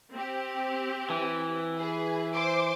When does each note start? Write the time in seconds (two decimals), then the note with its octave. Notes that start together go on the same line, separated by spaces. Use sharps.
0.13 C4 G4
1.10 E3
1.79 G#4 B4
2.34 C5 C6 D6